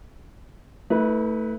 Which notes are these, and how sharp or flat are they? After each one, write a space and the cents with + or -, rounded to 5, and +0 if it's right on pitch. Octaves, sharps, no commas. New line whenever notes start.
A3 +20 E4 -40 B4 +0